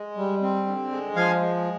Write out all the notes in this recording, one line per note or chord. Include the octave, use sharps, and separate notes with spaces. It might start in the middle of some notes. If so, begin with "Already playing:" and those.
Already playing: G#3
G3
C4
D3
G#3
F3 F5 G#5
G#3